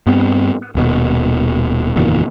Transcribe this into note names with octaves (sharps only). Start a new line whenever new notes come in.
G2 B3 C4
D#1 D#2 B2
F#1 E2 A#2 D#3